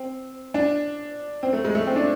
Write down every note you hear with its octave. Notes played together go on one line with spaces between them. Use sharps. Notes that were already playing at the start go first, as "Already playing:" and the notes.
Already playing: C4
D4
C4
A3
G#3
A3
C4
D4